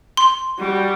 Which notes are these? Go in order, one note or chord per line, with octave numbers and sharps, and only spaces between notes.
C6
G3 F#4